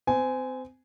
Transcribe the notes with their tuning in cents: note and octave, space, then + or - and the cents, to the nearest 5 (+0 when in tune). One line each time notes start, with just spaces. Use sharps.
C4 -30 G#5 +0